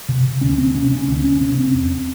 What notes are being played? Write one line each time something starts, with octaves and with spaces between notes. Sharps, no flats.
C3
D2 C#4
C4
C3 C#4
C#4
D2 C#4
C#4
C3 C#4
C4
E2